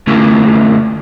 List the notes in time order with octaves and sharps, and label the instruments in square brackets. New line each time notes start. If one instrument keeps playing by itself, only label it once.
[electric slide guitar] D3 A3 A#3 C#4 E4